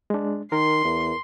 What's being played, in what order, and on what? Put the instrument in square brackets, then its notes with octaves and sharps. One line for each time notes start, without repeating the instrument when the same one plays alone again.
[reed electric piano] G#3 D4
[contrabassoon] D#3 [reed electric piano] A#4 [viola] C6
[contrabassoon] E2